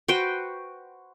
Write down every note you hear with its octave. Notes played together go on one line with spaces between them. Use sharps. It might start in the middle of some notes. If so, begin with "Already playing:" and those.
F#4 B4 C5 G5